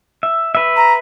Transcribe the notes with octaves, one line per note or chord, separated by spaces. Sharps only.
E5
B4 E5
A#5